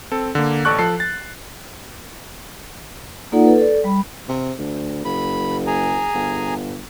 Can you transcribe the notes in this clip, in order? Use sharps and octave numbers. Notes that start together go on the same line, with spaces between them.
C4 A4
D3 A#3
A1 A4 D5 C#6 F#6
F3 A4 C7
A6
A#3 D#4 F4 A4 D5 F#5
A4 B4
A4 D5
G3 B5
C3
D2
F#1 B5
G#4 G#5 A#5
G1